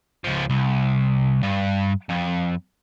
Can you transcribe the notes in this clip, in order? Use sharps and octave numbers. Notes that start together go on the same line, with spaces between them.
C#2 F3
C2
G2
F2